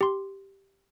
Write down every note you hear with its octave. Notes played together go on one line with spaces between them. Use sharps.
G4 C6